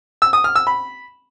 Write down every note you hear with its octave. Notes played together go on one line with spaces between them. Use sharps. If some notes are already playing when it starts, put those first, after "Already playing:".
E6
D#6
F6
E6
B5